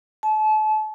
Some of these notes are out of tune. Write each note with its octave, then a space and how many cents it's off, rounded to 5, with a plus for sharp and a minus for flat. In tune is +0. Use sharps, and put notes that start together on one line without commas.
A5 -35